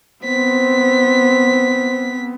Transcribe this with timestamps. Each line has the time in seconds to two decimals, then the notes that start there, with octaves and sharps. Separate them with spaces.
0.25 B3 C4 C5 B6